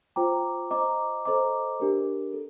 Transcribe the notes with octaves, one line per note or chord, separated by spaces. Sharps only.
F4 C5 G5 A#5 D6
C5 D#5 A#5 D6
A4 C5 D#5 A#5 D6
D4 G4 A#4
A4